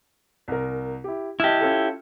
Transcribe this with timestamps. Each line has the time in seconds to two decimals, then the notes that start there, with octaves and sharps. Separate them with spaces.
0.48 C2 A#4
1.04 E4 G4
1.40 E4 G4 D#5 A5 F6
1.61 C#4 F4 A4